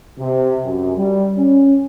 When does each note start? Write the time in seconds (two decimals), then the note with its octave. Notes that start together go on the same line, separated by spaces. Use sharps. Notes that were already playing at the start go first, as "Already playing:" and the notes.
0.19 C3
0.65 F#2
0.96 G3
1.37 C#4